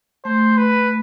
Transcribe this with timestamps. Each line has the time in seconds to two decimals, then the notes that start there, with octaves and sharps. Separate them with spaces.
0.25 A3 C5
0.57 B4